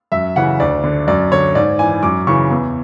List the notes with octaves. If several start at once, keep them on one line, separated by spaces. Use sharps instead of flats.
F#2 E5
C#3 E3 F#5
D2 D5
D3
F#2 D5
D3 C#5
G#2 D5
E3 G#5
F#2 D6
C#3 E3 C#6
E2